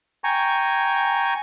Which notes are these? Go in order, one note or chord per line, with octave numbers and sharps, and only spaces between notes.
G5 G#5 A#5 C#6